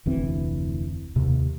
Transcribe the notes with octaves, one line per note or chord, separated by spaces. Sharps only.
F1 D2 E3 C4
D#2 C3